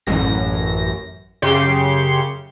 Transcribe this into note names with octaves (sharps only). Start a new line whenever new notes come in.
A1 F#2 A#6
F#2 C#3 G4 C6 C#7